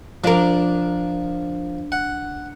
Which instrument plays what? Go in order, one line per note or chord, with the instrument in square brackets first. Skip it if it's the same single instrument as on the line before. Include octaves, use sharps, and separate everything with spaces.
[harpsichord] F3 [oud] D4 A#4
[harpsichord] F#5